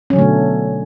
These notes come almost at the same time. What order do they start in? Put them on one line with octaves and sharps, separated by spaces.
C#4 F#3 D3 A3 B2